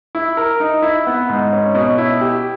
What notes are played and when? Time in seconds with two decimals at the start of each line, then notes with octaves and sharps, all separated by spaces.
0.15 E4
0.37 A#4
0.60 D#4
0.82 E4
1.07 B3
1.29 G#2
1.52 C#4
1.75 B2
1.98 E4
2.21 G4